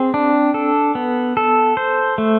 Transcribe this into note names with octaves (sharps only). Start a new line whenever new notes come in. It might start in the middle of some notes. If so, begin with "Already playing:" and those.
Already playing: C4 G#4
D4
A4
B3
A4
C5
A3